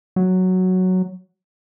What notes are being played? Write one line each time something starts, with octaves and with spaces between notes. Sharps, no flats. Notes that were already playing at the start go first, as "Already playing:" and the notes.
F#3